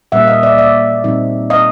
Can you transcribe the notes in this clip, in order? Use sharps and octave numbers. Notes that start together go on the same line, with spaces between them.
A#2 G3 A#3 C#4 E5 F#5
D#5 F5
D5 E5
D5 E5
A#2 G3 C4 D#4
D#5 F5